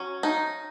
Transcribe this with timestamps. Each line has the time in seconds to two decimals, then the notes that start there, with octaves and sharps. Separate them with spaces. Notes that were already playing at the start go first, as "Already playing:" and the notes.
Already playing: F#3 C#4
0.23 D#4